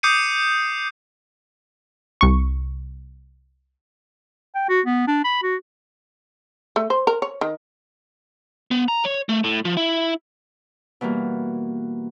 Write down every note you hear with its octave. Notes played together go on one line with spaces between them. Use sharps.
D6 D#6 G6 C7 C#7 D#7
C2 C#6
G5
F#4
B3
D4
B5
F#4
A3
C5
A#4
C#5
D#3
B3
A#5
C#5
A3
A2
F3
E4
B2 E3 G3 A#3